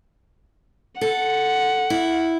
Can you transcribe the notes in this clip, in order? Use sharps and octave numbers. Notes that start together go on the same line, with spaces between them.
A4 F#5
E4